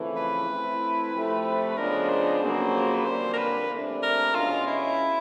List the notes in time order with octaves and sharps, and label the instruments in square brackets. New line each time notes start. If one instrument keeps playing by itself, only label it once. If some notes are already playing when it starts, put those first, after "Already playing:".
Already playing: [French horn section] F2 C#3 E3 A3
[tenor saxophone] B4
[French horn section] E3 A3 C4 E4
C3 F3 A3 C4
[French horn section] C#3 F3 G#3 B3 D4 [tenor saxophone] A#4
[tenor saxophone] C5
[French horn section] F2 C#3 F#3 A#3
[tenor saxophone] B4
[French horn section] F2 D3 G3 A#3 [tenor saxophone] C5
[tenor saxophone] A#4
B4
[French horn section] C3 E3 A3 D4
[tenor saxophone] A#4
[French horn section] E2 B2 G#3 C#4 [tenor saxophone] F4
[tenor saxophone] E4